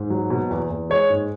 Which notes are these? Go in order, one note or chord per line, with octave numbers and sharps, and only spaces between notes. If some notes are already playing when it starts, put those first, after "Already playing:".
Already playing: G#2
F#3
B2
E2
E2
G#3 C#5
G#2